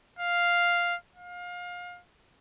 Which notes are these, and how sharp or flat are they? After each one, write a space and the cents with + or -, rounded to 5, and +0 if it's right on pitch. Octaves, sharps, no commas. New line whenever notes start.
F5 +0
F5 +25